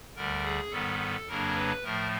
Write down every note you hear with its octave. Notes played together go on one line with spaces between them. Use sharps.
D2 D3 G3 A#4
G#4
G#2 D#3 G3 B3 A4
A4
F2 C#3 F#3 A#3 D4 A#4
B4
A2 F3 A3 A#4